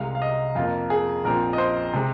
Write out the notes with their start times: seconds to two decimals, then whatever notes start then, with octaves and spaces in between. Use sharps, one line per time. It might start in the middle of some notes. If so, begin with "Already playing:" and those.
Already playing: C2 C3 G#3 F5
0.15 F5
0.22 D#5
0.55 F2 F3 A#3 F4
0.90 G#4
1.24 A#1 A#2 F3 C4 A#4
1.53 D#5
1.58 C5
1.94 C3 G#3 C4